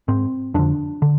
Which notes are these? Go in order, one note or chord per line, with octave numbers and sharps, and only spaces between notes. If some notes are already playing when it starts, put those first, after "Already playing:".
G#2 C4
F2 D3 D4
D3